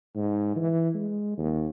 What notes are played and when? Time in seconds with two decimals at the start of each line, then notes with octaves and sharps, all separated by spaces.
0.15 G#2
0.56 E3
0.94 G#3
1.38 D#2